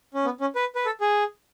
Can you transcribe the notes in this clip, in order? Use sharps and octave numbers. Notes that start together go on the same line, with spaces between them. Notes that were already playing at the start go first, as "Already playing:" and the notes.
C#4
B3
C#4
B4
B4
A4
G#4